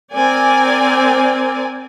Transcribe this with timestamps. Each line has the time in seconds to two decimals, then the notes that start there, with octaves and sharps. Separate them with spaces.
0.15 C4 A#4 D5 G#5